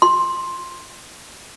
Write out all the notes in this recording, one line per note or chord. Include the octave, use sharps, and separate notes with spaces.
C6